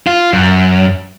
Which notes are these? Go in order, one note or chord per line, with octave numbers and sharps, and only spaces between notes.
F4
F#2